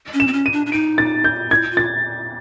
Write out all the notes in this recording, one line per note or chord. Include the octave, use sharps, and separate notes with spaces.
C#4
E7
C4
C#4
D#7
D4
D4
D#4 D7
A6
G6
E4 G#6
F4
A6